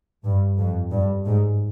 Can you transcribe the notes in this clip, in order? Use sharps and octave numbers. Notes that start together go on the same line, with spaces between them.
G2
F2
G2
G#2